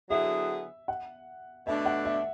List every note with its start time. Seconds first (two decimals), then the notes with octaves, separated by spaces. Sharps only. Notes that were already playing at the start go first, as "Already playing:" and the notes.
0.10 D3 F#3 B3 E4 G#4 E5
0.88 F#5
1.66 B2 A3 D4 E5
1.85 F#5
2.05 E5